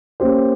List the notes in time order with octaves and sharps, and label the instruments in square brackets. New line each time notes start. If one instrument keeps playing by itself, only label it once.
[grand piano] A#3 C#4 G4 C5